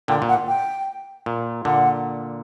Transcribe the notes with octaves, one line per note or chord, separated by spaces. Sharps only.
A#2 D3 G5
A#2
F#5
G5
A#2
A#2 D3 F#5